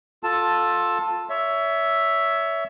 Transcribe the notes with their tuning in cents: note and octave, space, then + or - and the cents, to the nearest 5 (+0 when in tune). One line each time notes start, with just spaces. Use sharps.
F4 +20 A4 +0 A5 +0
C#5 +25 E5 +0